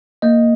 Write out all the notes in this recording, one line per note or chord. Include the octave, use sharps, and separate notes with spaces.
A#3 D#5